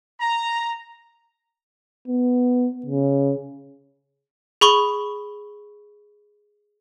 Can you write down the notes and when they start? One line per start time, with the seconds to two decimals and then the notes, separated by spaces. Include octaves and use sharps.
0.20 A#5
2.08 B3
2.86 C#3
4.61 G#4 B5 C#6 G7